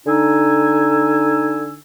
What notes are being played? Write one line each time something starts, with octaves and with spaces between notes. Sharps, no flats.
D3 D#4 G#5 E6